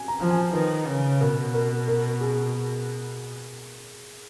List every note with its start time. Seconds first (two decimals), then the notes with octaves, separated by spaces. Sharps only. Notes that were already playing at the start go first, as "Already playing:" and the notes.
Already playing: G#5
0.08 A#5
0.20 F3
0.31 G#5
0.53 D#3 B4
0.86 C#3
1.20 B2 A#4
1.54 A#4
1.88 A#4
2.21 G#4